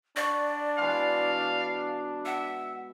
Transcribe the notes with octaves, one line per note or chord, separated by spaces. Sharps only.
D4 D5 F#5 C#6
B2 E3 G#3 F5
E5 F#5